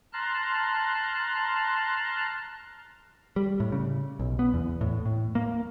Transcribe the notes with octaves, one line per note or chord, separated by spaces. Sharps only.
A5 A#5 C6 F6 F#6
G3
A2
C#3
B1
B3
E2
A2
A2
A#3